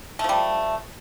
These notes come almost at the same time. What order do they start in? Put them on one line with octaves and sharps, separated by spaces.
A3 F3 G3